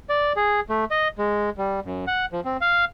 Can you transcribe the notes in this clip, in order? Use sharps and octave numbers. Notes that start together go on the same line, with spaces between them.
D5
G#4
A3
D#5
G#3
G3
F#2
F#5
F3
C4
F5